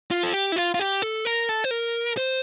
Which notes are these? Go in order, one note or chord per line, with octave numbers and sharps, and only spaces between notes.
F4
A4
G4
E4
F4
F4
G4
A4
A#4
A4
C5
A#4
C5